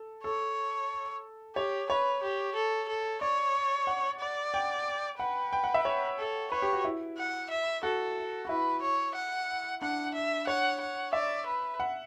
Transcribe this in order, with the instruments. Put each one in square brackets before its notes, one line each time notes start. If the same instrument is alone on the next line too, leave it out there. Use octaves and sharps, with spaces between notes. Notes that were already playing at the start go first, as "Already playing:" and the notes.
Already playing: [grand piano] A4
[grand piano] A4 [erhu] C#5
[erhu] G4 [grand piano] C#5
[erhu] B4 [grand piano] C#5
[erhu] G4
A4
A4
[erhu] C#5 [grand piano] D5
[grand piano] F#5
[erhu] D5
[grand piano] G5
[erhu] B4 [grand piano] F#5
[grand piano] G5
F#5
E5
C#5
[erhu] A4
[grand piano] B4 [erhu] C#5
[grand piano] G4
F#4
E4
[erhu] F#5
E5
[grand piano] F#4 [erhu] A4
[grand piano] F#4
[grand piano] E4 [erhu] B4
[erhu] C#5
F#5
[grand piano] D4 [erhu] F#5
[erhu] E5
[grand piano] C#5 [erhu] F#5
[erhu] F#5
[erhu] D5 [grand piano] E5
[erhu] B4
[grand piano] F#5